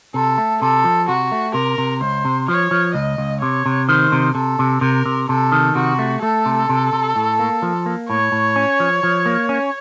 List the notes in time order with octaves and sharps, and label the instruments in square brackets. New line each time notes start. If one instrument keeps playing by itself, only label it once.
[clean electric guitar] C3 [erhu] A4
[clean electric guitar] A3
[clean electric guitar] C3 [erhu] A4
[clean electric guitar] F3
[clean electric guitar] C3 [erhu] F#4
[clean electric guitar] A3
[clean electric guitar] C3 [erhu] A#4
[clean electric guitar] C3
[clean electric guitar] C#2 [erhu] C5
[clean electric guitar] C3
[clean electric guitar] F3 [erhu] C#5
[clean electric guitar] F3
[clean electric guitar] C#2 [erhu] D#5
[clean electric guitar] C#2
[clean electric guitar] C3 [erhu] C#5
[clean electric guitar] C3
[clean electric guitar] D#3 [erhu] C5
[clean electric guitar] C3
[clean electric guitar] C3 [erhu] A4
[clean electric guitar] C3
[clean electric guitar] C3 [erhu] A#4
[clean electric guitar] C3
[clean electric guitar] C3 [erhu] A4
[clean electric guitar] D#3
[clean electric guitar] C3 [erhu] F#4
[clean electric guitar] A3
[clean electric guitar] A3 [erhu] A4
[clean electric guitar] C3
C3
C3
A2
A#3
F3
A#3
[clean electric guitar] A2 [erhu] C#5
[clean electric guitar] A2
C#4
F3
F3
A#3
C#4